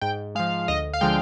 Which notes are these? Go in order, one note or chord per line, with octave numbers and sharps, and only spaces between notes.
G#2 G5
F3 G#3 F5
D2 D#5
F5
D3 F3 G#3 G5